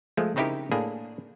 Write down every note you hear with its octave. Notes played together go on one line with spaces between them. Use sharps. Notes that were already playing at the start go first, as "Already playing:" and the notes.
F3 G#3 A3
C#3 C4 D#4 E4 G4 A#4
A2 A#3 D4 G#4